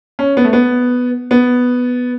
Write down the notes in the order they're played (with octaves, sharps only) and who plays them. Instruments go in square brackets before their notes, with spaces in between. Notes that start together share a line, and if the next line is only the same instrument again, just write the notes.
[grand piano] C#4
B3
A3
B3
B3